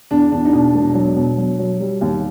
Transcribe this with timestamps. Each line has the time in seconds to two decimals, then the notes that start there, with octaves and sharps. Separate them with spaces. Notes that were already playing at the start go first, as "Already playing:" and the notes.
0.11 E2 D4
0.32 E2 D4
0.45 D#4
0.53 B2 D4
0.75 E1
0.95 F#3
1.16 B2
1.38 F#3
1.59 F#3
1.80 G3
2.01 D#2